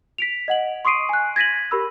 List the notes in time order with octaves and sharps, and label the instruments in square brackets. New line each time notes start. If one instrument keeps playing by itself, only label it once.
[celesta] B6 D7 F7
D#5 F#5 F#7
C6 C#6 D#6 C7 D7 D#7
G#5 F#6
G#6 A#6 B6 D#7 F#7
G4 A#4 B5 E6